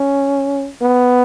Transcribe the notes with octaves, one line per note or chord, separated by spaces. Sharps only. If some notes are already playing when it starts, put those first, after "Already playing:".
Already playing: C#4
B3